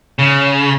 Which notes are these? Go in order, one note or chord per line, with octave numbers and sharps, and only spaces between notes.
C#3